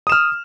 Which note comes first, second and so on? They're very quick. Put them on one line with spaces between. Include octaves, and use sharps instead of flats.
D#6 E7 F6